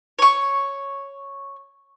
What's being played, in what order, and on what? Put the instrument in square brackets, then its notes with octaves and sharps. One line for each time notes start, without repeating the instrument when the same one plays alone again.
[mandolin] C#5 C#6